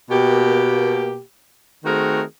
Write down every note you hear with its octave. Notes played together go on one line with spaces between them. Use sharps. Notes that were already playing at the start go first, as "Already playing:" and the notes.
B2 A#3 G4
D#3 A3 C4 F#4 G#4 A#4